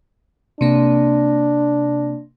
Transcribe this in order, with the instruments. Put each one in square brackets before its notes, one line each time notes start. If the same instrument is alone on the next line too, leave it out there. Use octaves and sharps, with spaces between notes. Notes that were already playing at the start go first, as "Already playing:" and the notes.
[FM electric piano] C3 A#3 [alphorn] D4